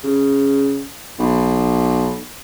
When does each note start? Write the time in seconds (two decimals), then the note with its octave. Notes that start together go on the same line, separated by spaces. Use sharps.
0.04 C#3
1.19 B1